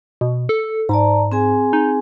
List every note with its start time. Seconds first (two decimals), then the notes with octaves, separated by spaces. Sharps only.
0.21 B2
0.49 A4
0.89 G#2 D5 A5 A#5
1.32 C4 G#4 G#5
1.73 D#4